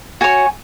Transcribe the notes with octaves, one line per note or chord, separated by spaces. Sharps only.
F#4 C#5 G#5